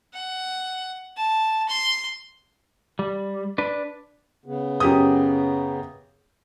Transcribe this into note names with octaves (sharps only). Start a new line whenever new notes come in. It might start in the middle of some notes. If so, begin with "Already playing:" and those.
F#5
A5
C6
G3
D4 B4
C#3 B3
F#2 G4 D#6